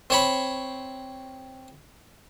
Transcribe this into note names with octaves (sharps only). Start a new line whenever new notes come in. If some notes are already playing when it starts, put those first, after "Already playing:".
C4 C#5 B5